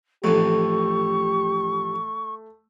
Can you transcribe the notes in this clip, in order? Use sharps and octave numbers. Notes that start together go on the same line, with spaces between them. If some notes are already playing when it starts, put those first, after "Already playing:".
A1 F2 A3 G4 C#6